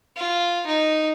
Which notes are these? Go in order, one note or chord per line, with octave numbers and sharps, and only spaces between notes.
F4
D#4